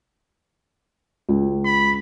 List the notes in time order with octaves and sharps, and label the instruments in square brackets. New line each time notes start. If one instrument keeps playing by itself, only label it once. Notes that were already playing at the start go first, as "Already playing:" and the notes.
[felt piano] C#2
[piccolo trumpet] B5